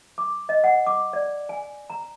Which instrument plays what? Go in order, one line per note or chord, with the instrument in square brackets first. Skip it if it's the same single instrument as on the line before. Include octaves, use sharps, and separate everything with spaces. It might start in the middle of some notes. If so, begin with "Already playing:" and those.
[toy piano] D6
D#5
F#5
D6
D5
G#5
A#5